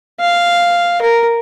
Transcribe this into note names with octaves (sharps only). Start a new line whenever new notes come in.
F5
A#4